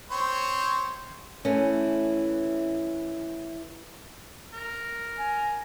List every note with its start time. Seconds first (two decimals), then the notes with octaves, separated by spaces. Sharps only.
0.11 C4 C5 C#5
1.45 E3 A3 C#4
4.53 A#4
5.18 G#5